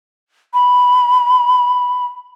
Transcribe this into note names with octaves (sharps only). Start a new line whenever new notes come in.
B5